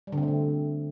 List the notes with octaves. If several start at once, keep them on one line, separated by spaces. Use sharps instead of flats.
G3
D3
C4
A3
B2